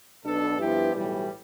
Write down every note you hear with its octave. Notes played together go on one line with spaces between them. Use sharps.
B1 B2 B3 D4 A4
G2 F3 B3 E4 G4
B1 A2 E3 G3